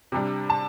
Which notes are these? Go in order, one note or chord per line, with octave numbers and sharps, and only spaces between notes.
C3 G3 D4
A5